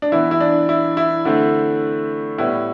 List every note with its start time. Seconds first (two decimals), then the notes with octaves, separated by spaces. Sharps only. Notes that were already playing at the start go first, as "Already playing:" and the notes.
0.02 D4
0.12 E3 B3 E4
0.31 E4
0.40 D4
0.69 E4
0.97 E4
1.25 D3 A3 C4 E4
2.38 A2 G3 B3 E4